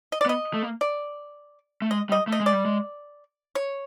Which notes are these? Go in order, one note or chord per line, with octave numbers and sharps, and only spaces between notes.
D#5
D5
B3
D#5
A3
A#3
D5
A3
G#3 D#5
G3 D#5
A3 D#5
G#3
D5
G3
G#3
C#5